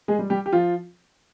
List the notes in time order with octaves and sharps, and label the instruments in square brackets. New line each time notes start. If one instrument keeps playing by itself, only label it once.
[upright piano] G#3 G#4
G3
G3 G4
G4
F3 F4